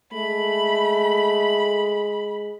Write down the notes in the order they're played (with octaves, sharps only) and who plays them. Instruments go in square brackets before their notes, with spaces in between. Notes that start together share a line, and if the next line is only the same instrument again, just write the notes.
[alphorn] G#3 [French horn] A3 [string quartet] B5